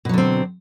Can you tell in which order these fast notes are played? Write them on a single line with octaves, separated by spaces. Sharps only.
B2 F#3 D3 C4